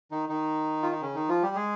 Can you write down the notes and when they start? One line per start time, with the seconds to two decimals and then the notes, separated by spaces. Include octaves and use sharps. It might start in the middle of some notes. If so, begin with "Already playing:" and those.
0.11 D#3 D#4
0.29 D#3 D#4
0.83 F4
0.92 D#4
1.01 C#3 C#4
1.15 D#3 D#4
1.29 F3 F4
1.42 G3 G4
1.55 G#3 G#4